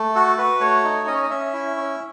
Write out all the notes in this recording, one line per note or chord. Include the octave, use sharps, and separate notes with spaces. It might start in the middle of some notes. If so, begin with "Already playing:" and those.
Already playing: A3
F#4 A4
F#4 B4
A3 C#5
D#4
C#4 D#5
C#5
D#5
C#4 E5
E4
C#4